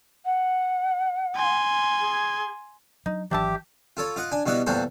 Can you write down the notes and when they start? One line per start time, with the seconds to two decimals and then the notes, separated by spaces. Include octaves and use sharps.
0.25 F#5
1.36 G#5 C6
2.00 G#4
3.06 F#3 D4 D#4
3.31 G#1 E3 F#3 D4 G4 E5 A5
3.97 F4 A4 C#5
4.16 F4 D#5 F#5
4.32 D4 G#5
4.46 B2 G3 B3 E4 D#5 F#5
4.67 E2 A#2 G3 F#4 A4 C5